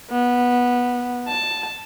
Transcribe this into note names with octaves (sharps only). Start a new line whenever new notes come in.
B3
A5